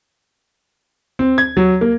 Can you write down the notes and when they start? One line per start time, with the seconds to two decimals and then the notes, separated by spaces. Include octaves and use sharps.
1.19 C4
1.38 G#6
1.57 F#3
1.81 A#3